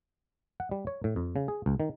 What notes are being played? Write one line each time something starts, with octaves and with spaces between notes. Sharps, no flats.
F#5
G3
C#5
A2
F2
C#3
G#4
C#2
D#3